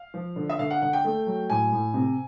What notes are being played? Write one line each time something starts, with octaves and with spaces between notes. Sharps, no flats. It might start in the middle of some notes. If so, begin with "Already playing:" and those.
Already playing: F5
F3
D3
E5
D3 F5
F#5
D3 F#5
G5
A3
F#3
A2 G#5
A2
C3